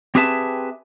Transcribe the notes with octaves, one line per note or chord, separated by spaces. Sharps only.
C4 G4 G#4 B4 E5 A5